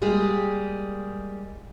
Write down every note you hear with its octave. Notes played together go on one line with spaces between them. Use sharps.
G3 G#3 A#3 G4 G#4